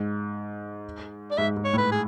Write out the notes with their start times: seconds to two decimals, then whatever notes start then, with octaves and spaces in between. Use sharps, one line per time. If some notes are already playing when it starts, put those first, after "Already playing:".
Already playing: G#2
1.31 D5
1.38 G#2 E5
1.57 G#2
1.64 C#5
1.73 A2 B4
1.92 G#4